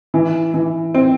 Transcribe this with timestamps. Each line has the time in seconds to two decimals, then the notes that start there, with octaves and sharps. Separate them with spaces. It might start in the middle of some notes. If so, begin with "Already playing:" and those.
0.14 E3
0.54 E3
0.94 C4